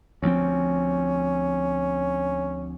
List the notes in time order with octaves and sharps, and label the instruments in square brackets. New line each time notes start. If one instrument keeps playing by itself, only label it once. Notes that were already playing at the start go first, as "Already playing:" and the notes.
[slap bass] D2 F3 C4 [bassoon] C#4